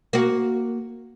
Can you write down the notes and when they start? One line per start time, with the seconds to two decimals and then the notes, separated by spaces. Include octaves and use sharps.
0.13 A#3 F#4